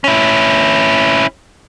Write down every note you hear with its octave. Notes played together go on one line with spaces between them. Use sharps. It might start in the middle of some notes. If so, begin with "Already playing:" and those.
C#4 E4